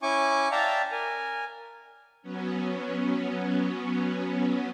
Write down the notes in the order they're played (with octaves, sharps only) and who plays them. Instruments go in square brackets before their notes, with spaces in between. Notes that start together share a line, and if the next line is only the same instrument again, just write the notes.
[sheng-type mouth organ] C#4 E4 G#5 C#6 D6
D5 E5 F5 G5 A5 A#5
A#4 G#5
[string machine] F#3 B3 C#4